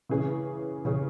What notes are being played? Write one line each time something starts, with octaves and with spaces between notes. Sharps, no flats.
C#3 E3 C#4 G#4
C#3 E3 C#4 G#4